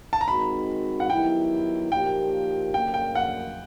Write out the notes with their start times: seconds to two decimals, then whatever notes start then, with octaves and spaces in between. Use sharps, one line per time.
0.13 A5
0.21 A#5
0.28 D#3 G#3 C4 D#4 F#4 B5
1.00 F#5
1.10 D#3 F#3 B3 E4 G4 G5
1.91 A#2 F3 A#3 D#4 G4 G5
2.74 D2 C#3 F#3 A#3 G5
2.94 G5
3.15 F#5